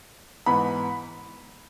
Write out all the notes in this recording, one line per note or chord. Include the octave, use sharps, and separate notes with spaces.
G#2 E3 B3 B5